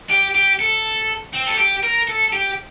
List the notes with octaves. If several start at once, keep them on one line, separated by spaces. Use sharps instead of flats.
G4
G4
A4
C4
A4
G4
A#4
A4
G4